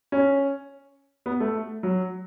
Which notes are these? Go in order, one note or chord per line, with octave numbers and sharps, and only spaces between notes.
C#4
B3
A3
F#3